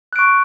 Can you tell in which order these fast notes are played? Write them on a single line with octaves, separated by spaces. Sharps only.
F#6 D7 C#6